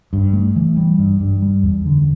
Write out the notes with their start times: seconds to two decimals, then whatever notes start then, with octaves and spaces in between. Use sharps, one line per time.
0.13 G2
0.33 A3
0.56 E3
0.77 G3
0.99 G2
1.20 G2
1.42 G3
1.63 E2
1.85 D3